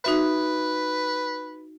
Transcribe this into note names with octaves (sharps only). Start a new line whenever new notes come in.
D#4 F#4 B4 E5